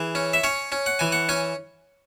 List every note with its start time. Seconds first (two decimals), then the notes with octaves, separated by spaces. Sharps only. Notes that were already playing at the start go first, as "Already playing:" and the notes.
Already playing: E3 G#4
0.15 C#4
0.33 E5
0.44 C#4 C#5
0.72 C#4
0.86 F#5
0.99 E3 G#5
1.12 F#5
1.29 C#4 G#5